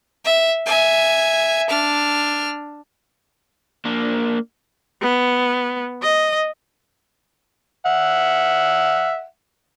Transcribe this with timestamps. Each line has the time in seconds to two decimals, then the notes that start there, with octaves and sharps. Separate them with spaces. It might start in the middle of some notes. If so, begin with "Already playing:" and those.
0.25 E5
0.66 E5 G#5
1.70 D4 F6
3.85 A#3 D4
5.02 B3
6.02 D#5
7.86 E5 F#5